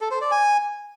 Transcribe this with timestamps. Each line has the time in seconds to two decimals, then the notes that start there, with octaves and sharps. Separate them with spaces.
0.01 A4
0.11 C5
0.21 D5
0.31 G#5